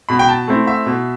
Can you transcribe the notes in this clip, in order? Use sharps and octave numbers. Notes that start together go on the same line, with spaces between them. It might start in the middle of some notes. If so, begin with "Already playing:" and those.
B2 B5
G5
A5
A3 C4 E4
E5
B2